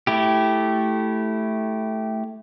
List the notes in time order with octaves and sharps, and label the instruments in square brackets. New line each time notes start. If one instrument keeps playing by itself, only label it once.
[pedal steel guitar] A3 E4 G4